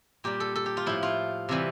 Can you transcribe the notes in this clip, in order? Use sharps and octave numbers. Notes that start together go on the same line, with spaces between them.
A#2 G3 G4
A4
A4
G4
F4
A2 F3 E4
F4
C3 E3 G3